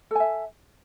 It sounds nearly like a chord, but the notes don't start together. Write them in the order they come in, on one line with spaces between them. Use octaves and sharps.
A4 G#5 E5